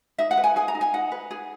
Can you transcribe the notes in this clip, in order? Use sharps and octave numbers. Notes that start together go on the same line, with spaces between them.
D#4 E5
F#5
B4
G#5
G#4 G#5
A#5
D#4
G#5
D#4 F#5
B4
G#4